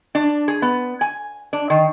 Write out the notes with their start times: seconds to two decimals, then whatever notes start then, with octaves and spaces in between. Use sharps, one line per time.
0.15 D4
0.48 G#4
0.62 B3
1.01 G#5
1.53 D4
1.70 D#3